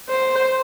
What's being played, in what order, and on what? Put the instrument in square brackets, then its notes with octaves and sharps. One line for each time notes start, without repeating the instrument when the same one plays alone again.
[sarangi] C5